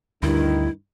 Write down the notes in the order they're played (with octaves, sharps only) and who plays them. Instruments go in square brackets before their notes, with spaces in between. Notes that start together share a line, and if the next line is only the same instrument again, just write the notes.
[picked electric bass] D2 [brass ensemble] G2 D#3 [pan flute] E4